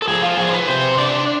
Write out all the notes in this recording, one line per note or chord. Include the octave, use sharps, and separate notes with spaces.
A4
F3 G#4
F4
F3 G#4
C5
B4
C3 C5
D4 D5